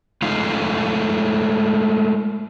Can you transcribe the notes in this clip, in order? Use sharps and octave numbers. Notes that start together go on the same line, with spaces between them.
G#3 A3 D#4 F4 F5